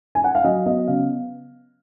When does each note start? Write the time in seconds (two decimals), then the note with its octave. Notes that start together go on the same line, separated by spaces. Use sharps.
0.15 G#5
0.24 F#5
0.35 F5
0.44 F#3 D#5
0.66 B3 D#5
0.87 C#3 F5